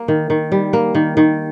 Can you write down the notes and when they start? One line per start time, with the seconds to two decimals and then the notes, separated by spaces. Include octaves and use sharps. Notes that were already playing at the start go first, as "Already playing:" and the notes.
Already playing: A#3
0.08 D#3
0.30 D#3
0.52 G3
0.73 A#3
0.95 D#3
1.17 D#3